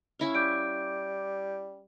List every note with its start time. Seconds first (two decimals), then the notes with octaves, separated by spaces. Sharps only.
0.19 C#4 E4 F5
0.35 G3 D6 G6 D7